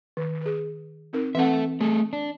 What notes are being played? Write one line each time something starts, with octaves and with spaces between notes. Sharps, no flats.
D#3
G#4 B4
C4 D#4 A#4
E3 C4 A4 E5 F#5
A3 G#4 A4
D4